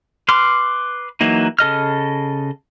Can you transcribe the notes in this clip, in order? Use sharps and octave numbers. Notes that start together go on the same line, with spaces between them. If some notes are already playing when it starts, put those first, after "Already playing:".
B4 C6 D6 F6
E3 F#3 A#3 D#4
C#3 A4 D#5 F6